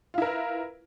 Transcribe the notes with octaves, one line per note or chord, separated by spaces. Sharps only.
E4 F4 A#4 B4